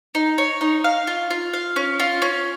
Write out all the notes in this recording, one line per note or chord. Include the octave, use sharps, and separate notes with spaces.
D#4
C#5
D#4
F5
F4
F4
F5
C#4
F4
C#4